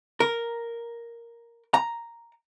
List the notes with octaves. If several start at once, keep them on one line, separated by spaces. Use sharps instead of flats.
A#4
A#5